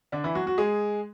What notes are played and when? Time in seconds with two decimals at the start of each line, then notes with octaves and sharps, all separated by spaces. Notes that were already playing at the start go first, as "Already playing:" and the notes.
0.12 D3 D4
0.24 E3 E4
0.35 F#3 F#4
0.46 F#3 F#4
0.58 G#3 G#4